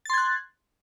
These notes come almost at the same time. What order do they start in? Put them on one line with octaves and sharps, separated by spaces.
A6 C6 G#6 F#6